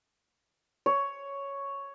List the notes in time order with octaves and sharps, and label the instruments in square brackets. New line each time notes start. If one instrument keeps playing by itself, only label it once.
[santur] C#5